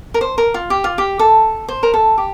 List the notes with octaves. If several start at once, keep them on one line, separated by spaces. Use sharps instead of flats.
A#4
C5
A#4
F4
G4
F4
G4
A4
C5
A#4
A4
G4